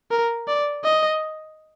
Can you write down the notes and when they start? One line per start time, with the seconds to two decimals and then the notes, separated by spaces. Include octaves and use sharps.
0.11 A#4
0.48 D5
0.84 D#5